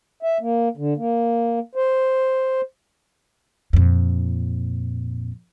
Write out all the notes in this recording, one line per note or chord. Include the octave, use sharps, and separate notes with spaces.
E5
A#3
D3
A#3
C5
F2 A#2